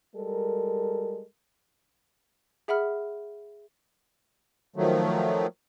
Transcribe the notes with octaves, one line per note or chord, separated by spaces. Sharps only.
G3 G#3 A4 A#4
G#4 E5 F#5 B5 F6
D#3 F3 F#3 A3